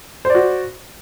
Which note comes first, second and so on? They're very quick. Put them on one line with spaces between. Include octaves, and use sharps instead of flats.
C5 D5 F#4